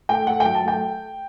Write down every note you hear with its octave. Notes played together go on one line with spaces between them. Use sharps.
A3 G5
A3 F#5
F#3 G5
A5
A3 G5